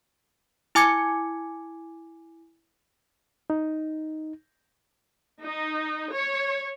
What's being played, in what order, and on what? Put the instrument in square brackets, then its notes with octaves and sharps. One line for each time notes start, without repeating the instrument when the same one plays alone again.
[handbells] E4 G#5 D6 G#6 C#7
[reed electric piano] D#4
[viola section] D#4
C#5